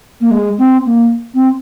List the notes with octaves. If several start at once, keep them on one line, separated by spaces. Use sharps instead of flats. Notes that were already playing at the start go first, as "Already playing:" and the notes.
A#3
G#3
C4
A#3
C4